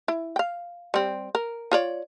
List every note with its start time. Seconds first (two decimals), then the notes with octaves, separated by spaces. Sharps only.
0.08 E4
0.36 F5 G5
0.94 G3 C4
1.35 A#4
1.72 F4 C#5 D5